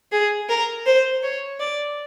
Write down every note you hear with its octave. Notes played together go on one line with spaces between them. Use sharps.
G#4
A#4
C5
C#5
D5